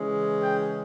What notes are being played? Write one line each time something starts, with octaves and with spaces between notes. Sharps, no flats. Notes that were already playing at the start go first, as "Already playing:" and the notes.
Already playing: C#3 E3 G#3 C#4
G5